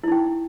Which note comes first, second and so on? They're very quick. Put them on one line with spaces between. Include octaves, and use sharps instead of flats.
E4 D#4 G5